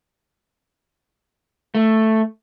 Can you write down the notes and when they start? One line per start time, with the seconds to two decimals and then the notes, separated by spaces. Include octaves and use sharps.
1.75 A3